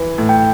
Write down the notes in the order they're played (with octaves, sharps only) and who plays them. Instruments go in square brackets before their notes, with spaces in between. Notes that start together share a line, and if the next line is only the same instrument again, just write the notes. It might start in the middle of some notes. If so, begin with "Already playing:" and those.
Already playing: [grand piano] E3
A2
[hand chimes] G5